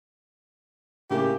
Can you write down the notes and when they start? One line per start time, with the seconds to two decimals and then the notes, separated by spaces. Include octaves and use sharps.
1.10 A2 C#3 A#3 G4